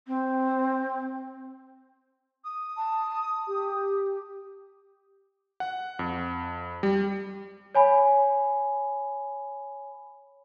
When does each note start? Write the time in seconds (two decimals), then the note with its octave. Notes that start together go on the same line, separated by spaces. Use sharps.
0.07 C4
2.45 D#6
2.77 A5
3.47 G4
5.60 F#5
5.99 F2
6.83 G3
7.75 C#5 G#5 B5